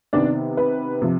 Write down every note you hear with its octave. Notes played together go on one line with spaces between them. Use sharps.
C3 D#3 B3 D4 D5
B4
C3 F3